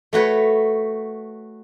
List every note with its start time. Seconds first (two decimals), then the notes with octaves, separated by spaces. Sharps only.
0.13 A3 F#4 B4 C#5